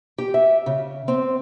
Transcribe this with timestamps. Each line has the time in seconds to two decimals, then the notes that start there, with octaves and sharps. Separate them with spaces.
0.18 G4
0.34 E5
0.66 C#3
1.08 C4